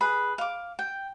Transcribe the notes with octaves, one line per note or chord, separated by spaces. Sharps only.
G#4 B4 B5
F5 D6
G5